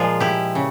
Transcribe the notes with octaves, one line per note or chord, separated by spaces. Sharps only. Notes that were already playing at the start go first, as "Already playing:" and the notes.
Already playing: A#2 F3 G#3 F4 G#4
E4 G4
C#3